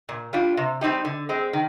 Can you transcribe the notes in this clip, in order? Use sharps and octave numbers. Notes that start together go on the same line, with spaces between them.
A#2
G3 D4 F4
C3
G3 C4 D#4 G4
D3
G#3 C4
D#3